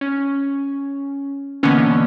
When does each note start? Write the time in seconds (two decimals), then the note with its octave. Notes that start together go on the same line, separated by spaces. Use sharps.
0.01 C#4
1.63 B2 D3 E3 A#3 B3 C#4